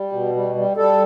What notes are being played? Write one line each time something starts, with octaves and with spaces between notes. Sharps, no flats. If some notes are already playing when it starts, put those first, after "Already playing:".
Already playing: G3
B2
G3
G3
G3 A4